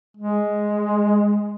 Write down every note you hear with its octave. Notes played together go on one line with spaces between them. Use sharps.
G#3